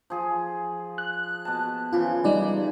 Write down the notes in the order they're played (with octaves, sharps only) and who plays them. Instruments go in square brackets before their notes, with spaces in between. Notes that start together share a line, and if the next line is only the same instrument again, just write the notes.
[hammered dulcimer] F3 G#4
[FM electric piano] F#6
[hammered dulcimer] B2 A5
[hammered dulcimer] C#3 E3 F3 [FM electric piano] F4
[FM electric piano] G3 D#4 D5